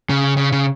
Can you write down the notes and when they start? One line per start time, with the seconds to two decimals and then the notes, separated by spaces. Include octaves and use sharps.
0.10 C#3
0.37 C#3
0.52 C#3